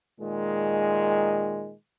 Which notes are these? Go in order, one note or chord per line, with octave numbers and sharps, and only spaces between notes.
A#2 D#3 G#3